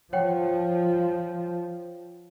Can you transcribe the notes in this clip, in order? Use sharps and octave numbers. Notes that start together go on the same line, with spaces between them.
F3 C#5 F#5 G5